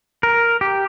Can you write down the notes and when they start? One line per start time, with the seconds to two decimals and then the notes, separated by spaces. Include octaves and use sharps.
0.23 A#4
0.61 G4